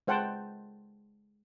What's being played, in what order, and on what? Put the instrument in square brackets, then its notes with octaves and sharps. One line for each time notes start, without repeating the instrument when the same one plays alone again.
[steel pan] G#3 C5 F#5 G5 A5